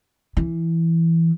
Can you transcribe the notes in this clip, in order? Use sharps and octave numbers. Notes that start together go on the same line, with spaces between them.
E3